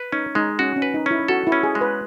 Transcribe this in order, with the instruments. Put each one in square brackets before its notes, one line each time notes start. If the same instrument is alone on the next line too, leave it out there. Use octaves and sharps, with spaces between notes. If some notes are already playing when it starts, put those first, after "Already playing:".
Already playing: [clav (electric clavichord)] B4
[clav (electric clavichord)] C#4 [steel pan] D#4
[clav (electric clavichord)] G#3 [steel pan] D#4
[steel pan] C#4 [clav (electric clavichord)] F#4
[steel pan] C#4
[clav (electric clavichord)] B4
[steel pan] D#4
[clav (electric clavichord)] C#4 [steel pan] E4
[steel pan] F#4 [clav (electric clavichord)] A4
[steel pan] E4
[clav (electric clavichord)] C#4
[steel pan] G#4
[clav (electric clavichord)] G#3
[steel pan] B4